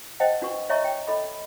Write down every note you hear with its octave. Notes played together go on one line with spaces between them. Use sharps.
C5 D#5 F#5 G5 A5
D4 F#4 B4 C#6
C#5 D#5 E5 G#5 A#5 C#6
G5
A4 D#5 B5